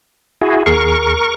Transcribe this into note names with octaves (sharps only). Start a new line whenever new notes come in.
E4 F#4 G#4
D#2 G#4 A#4 C#6 C7